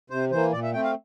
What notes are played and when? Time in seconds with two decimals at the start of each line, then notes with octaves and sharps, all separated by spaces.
0.10 C3 C5
0.31 E3 A#3 C5
0.52 A#2 D5
0.63 E5
0.73 A3 C4 G5
0.84 F5